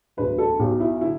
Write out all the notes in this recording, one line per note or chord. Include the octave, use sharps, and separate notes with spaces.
E1 D2 D3 F#3 B4
A4
B1 B2 F#3 G4
E4
D3 E4